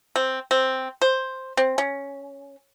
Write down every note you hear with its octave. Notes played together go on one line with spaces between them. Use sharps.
C4
C4
C5
C4
C#4